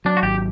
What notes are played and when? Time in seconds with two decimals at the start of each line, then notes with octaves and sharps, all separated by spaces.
0.05 F#3 D4
0.17 F#4
0.23 G#1 G4